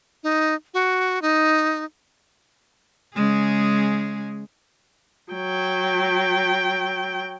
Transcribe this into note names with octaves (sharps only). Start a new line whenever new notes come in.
D#4
F#4
D#4
C#3 G#3 G#4
F#3 G5